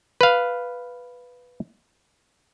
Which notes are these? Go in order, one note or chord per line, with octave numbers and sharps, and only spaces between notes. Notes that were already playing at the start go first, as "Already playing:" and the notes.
B4 F5